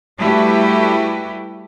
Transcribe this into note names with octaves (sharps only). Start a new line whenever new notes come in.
G3 A3 E4 F#4 G4 B4